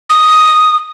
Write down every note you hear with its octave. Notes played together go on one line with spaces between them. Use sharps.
D#6